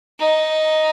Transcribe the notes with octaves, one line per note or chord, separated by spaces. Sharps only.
D#4